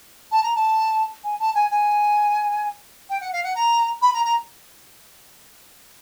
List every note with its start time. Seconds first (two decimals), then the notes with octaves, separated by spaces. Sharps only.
0.31 A5
0.43 A#5
0.55 A5
1.24 G#5
1.39 A5
1.55 G#5
1.71 G#5
3.10 G5
3.21 F#5
3.33 F5
3.44 F#5
3.55 A#5
4.02 B5
4.14 A#5
4.25 A#5